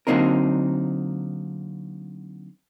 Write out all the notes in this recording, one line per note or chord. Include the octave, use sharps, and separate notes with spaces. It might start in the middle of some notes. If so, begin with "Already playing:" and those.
D3 F#3 A#3 C4 D#4 A#4